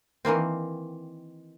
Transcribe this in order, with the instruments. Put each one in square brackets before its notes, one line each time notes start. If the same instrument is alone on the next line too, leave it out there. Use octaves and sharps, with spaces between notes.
[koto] D#3 E3 A#3 C4